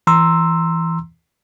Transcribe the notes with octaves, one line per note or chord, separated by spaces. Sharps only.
E3 A#5 C6 E6